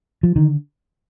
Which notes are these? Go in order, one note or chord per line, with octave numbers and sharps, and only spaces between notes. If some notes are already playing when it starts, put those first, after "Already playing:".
F3
D3 D#3